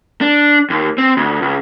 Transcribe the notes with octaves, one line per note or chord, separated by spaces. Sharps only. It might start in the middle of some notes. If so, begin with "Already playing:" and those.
D4
D#2
C4
D2
C#2